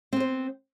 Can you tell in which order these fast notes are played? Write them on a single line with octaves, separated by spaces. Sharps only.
C4 B3 C5